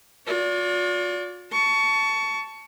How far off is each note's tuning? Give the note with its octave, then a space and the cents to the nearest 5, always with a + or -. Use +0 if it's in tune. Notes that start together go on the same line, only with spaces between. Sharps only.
F4 +40 D5 -30
A5 +0 C#6 +20